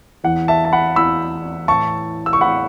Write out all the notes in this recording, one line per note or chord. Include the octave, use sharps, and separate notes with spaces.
E2 E3 F#5
E5 A5
A5
F#5 B5
E2 E3 B5 E6
A2 E3 A5 C#6
E6
C#6
A2 E3 F#5 B5